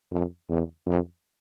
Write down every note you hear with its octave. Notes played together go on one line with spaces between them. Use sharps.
F2
E2
F2